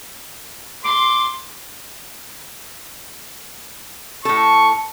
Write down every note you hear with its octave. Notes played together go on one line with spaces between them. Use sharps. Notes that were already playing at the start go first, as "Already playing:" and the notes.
C6 D6
A2 A4 C#6